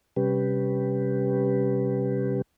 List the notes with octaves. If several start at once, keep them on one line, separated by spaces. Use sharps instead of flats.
C3 G3 C#4 G4 B4